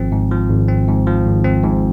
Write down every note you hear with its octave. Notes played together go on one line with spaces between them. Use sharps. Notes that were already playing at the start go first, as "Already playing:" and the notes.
Already playing: G#1 F3 C4
G#2
F3
G#1
C4
G#2
F3
G#1
C4
G#2